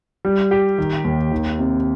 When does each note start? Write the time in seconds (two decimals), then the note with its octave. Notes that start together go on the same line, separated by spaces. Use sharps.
0.25 G3
0.51 G4
0.78 D#3
1.05 D#2
1.32 D#3
1.59 C3